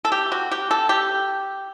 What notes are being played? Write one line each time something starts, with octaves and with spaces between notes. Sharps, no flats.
A4
G4
F#4
G4
A4
G4